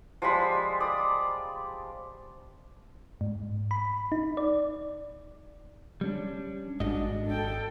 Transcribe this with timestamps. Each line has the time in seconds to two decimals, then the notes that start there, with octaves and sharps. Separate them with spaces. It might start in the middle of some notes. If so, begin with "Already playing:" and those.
0.22 F3 G3 G#3 B5
0.80 D5 D#6
3.21 G#2
3.71 B5
4.12 D#4
4.37 D5
6.01 G3 C#4 D4
6.80 G#1 G#2 D4 F#4 D#5
7.26 A4 G5